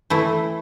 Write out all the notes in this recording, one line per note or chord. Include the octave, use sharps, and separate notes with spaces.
E3 A3 E4